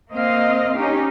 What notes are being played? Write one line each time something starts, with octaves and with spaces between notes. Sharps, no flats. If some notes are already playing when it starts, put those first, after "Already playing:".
A#3 C4 D#5 F5
C#4 D#4 G4